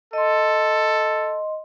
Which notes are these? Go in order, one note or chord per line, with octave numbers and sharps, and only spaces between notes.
A4 D#5 C6